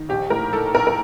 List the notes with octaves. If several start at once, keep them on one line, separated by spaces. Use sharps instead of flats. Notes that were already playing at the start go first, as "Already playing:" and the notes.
Already playing: D#3
A#1 G4
A2 A#4
A2 A4
A#1 A#4
A#4